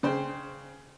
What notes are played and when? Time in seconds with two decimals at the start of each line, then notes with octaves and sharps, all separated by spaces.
0.03 C#3 C5 G5